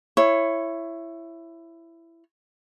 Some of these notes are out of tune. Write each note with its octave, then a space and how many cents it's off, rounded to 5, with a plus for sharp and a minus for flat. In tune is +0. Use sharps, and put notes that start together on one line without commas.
E4 +15 C#5 -10